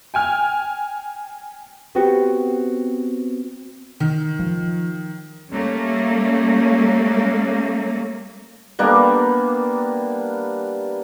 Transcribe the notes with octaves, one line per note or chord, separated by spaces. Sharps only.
G5 G#5 F6
B3 C4 F#4 G4 B4 C5
D#3
F3
G3 A3 A#3 C#4
G3 A#3 B3 D4